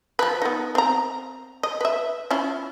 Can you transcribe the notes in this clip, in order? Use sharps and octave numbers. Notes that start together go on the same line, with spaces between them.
F3 B4
B3 D#4
C4 A#5
D#5
B4 E5
C#4 E4 F4